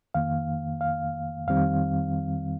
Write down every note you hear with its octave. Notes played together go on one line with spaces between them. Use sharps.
F2 D#3 A#3 F5
F5
F2 D#3 G3 C4 F5